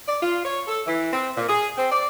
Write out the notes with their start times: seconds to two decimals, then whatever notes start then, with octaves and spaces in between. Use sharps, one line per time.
0.06 D5
0.20 F4
0.44 C#5
0.67 A4
0.86 E3
1.12 C4
1.35 A#2
1.48 G#4
1.76 C4
1.91 D5